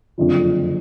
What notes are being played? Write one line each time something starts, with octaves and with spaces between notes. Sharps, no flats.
F#1 F2 D3 F3